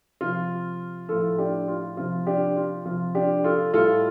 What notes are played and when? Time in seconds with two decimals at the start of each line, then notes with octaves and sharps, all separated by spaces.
0.21 C3 F3 F4
1.09 A2 F3 F4 A4
1.38 D4 G4
1.68 F4
1.97 C3 F3 F4
2.27 D4 G4
2.56 F4
2.85 C3 F3 F4
3.15 D4 G4
3.44 F4 A4
3.74 A2 G3 F4 A4